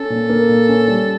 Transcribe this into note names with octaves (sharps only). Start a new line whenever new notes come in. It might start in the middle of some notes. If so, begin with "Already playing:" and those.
Already playing: C#4 A4
A#2
A#3
A#2
C#4
G3